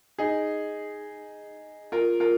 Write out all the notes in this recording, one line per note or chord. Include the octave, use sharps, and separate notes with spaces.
D#4 G#4
F4 A#4
F4 A#4